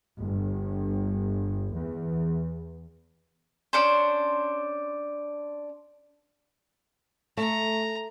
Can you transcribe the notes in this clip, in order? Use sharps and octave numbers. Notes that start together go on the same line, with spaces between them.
G1
E2
C#4 D4 C5
A3 A#5